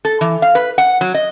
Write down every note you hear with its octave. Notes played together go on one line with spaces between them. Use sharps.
A4
E3
F5
B4
F#5
F#3
D#5